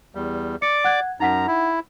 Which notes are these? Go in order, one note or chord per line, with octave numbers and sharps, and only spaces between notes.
E2 G3
D5 D6 C#7
F#5 F#6 G#6
F#2 D#4 F#5 A#5 B6
E4